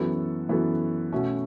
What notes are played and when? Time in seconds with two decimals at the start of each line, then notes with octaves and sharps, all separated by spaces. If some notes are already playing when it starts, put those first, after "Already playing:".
Already playing: F#2 E3 B3 F#4 A4
0.49 F#2 E3 B3 F#4 A4
1.12 B2 A3 C#4 F#4